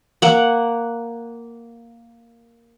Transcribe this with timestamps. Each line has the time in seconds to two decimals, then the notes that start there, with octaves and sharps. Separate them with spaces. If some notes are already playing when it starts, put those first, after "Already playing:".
0.22 A#3 F#5